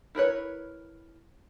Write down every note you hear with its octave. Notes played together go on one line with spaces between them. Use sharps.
E4 A#4 B4 C#5